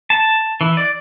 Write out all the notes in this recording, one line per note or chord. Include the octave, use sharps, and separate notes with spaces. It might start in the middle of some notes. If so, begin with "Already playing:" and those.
A5
E3
D5